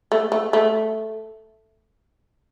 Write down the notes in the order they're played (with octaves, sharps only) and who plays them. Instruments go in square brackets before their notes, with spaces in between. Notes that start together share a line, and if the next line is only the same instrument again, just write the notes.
[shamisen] A3
A3
A3